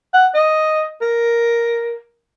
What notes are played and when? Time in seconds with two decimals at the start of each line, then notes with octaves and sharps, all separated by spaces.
0.14 F#5
0.34 D#5
1.01 A#4